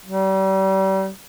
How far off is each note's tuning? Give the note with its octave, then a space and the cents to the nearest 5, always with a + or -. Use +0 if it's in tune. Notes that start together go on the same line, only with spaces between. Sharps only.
G3 -35